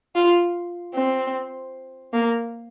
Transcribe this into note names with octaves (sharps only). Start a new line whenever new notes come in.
F4
C4
A#3